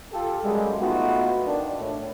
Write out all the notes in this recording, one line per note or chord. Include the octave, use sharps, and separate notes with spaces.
F4 G4 A4
F#2 G3 G#3
A3 B3 D#4 F4 F#4
D#3 D4
A2